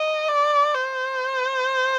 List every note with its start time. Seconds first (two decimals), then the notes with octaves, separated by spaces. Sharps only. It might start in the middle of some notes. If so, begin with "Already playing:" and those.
Already playing: D#5
0.29 D5
0.74 C5